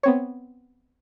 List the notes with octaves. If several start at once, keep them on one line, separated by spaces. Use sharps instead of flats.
B3 C4 C#5